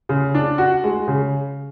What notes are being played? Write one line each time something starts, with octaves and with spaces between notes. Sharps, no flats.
C#3
D4
F#4
G#3
C#3